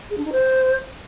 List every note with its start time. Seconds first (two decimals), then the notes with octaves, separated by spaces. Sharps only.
0.10 G#4
0.18 D4
0.25 D#4
0.32 C5